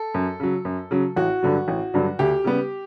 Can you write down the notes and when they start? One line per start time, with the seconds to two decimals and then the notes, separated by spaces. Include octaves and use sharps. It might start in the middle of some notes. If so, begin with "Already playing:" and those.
Already playing: A4
0.14 F#2
0.40 C#3 F#3
0.65 F#2
0.91 C#3 F#3
1.16 A1 F#4
1.43 G2 D3 F#3
1.68 A1
1.94 G2 D3 F#3
2.19 D2 G4
2.44 C#3 G3 B3